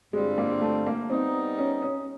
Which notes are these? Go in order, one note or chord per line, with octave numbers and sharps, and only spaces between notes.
G2 D3 G3 G#3 C4 F4
A#3
A3
A#3
G3 B3 C4 D#4
C#4
C#4